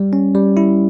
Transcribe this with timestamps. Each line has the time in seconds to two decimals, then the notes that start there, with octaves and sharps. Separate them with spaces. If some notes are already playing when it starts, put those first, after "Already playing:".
Already playing: G3
0.13 C#4
0.35 G3
0.57 E4